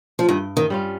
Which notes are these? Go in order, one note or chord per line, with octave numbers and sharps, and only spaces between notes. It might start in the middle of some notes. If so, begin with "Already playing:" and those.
F3
G2 D#3
D#3
G3 C#4 F4